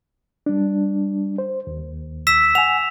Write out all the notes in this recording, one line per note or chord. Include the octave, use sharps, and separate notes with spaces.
G3 D4
C5
D#2
E6 B6 E7
F#5 G#5 F7